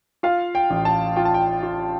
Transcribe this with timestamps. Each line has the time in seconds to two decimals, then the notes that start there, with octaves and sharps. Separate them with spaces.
0.23 F4 F5
0.55 G5
0.70 A1
0.85 A5
1.16 F4 G5
1.25 A5
1.34 G5
1.63 F4